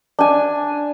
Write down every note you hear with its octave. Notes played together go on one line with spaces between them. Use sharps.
D4 G#5